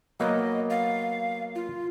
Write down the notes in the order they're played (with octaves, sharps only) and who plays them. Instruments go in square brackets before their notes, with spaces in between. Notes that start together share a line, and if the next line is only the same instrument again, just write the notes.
[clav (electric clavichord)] F#3 A#3 B3 [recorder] D#5
[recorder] F5
F4